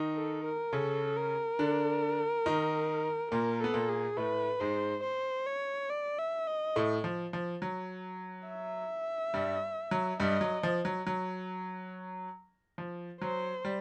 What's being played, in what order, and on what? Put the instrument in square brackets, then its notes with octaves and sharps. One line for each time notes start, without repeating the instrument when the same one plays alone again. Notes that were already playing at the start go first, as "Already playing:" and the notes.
Already playing: [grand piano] D#3 D#4
[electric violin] A4
A#4
[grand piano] C#3 C#4 [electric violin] A4
[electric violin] A#4
[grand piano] D3 D4
D#3 D#4
[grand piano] A#2 A#3 [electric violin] A#4
[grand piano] B3 [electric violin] A4
[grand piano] A#2 A#3
[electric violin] G#4
[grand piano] A2 A3 [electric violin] B4
[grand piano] G#2 G#3 [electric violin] C5
[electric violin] C5
C#5
D5
E5
D#5
[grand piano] A2 A3
F3
F3
F#3
[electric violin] E5
[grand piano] G2 G3
F#3
[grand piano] G2 G3 [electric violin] D#5
[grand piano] F#3
F3
F#3
F#3
F3
[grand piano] F#3 [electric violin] C5
[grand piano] G3